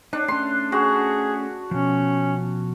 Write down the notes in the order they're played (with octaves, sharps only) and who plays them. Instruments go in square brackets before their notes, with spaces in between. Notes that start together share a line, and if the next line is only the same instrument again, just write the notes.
[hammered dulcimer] D4 [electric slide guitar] D#4
[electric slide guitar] A3 C#4 [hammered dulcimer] C6
[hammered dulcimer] F#4 [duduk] G#4
[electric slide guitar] B2 F3 [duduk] C#4